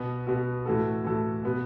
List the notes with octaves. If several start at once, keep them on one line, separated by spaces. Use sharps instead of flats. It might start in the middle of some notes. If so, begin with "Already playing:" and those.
Already playing: B2 B3 F#4
B2 B3 F#4
A2 E3 A3 F#4 A4
A2 E3 A3 F#4 A4
B2 B3 F#4 B4